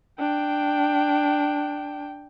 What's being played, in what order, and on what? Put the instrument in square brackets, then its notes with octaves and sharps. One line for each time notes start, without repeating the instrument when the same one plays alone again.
[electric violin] D4 G5